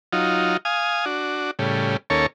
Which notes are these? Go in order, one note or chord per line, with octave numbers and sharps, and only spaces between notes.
F#3 D#4 F4
F5 G#5 D#6
D4 F#4
A2 C#3 G3
D#2 A#3 C#4 A4 C#5